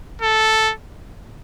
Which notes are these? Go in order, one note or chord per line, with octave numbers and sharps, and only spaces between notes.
A4